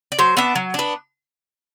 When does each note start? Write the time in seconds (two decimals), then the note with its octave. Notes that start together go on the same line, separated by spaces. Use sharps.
0.12 D5
0.19 F#3 C5
0.37 B3 D4 E5
0.55 F#3
0.74 B3 D4